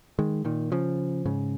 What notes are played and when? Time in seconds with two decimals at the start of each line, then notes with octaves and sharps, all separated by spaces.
0.19 D#3 G#3
0.45 A#2 D#3
0.72 C#3 F3
1.25 G#2 C#3